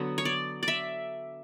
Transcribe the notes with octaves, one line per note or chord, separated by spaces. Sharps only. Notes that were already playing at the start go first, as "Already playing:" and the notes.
Already playing: D3 F#3 B3
C#5
D5
D5
E5